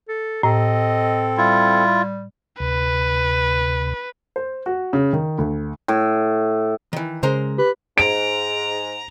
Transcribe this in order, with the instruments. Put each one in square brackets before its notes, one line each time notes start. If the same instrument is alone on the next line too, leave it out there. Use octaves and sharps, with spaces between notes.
[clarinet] A4
[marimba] A2 [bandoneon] C4 A4 [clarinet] D#5
[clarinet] G3 [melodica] E4 F4
[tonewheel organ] D2 C3 B5 [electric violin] B4
[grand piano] C5
F#4
C#3
D#3
D2
[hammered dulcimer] A2
[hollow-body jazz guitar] D#3 E3
[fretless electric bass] C#3 [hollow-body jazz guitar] G#3 A#4 C5
[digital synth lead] G4 [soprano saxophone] B4
[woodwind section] G#2 [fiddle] A#5 [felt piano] D7